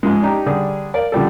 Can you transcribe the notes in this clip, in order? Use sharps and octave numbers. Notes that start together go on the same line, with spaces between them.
G#2 F3 G#3
D4 D#4 G4
D3 G3 D4 G#4
A#4 D5 F5
D3 F3 G3 A4